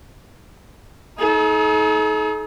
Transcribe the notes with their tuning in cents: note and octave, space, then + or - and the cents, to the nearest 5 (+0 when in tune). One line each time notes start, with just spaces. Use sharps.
D#4 +30 A4 -45